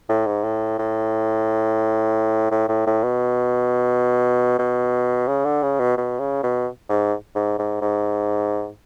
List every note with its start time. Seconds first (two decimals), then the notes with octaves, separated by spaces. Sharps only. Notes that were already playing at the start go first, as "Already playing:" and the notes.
0.09 A2
0.27 G#2
0.44 A2
0.79 A2
2.51 A2
2.69 A2
2.86 A2
3.03 B2
4.59 B2
5.28 C#3
5.45 D3
5.63 C#3
5.80 B2
5.97 B2
6.20 C#3
6.43 B2
6.89 G#2
7.35 G#2
7.59 G#2
7.81 G#2